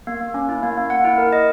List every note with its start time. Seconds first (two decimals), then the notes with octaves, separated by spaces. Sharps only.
0.07 A#3
0.21 A#3
0.34 C#4
0.49 E4
0.63 A#3
0.77 A#3
0.90 F#5
1.05 E4
1.18 A#4
1.32 D#5